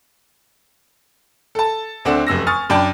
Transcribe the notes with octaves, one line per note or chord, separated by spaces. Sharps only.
A4 A5
D2 A3 C4 D4 F#5 E7
F1 F#2 E6 A#6
G#5 C#6 D#6 F6 A6
F#2 D4 G5 A5 B5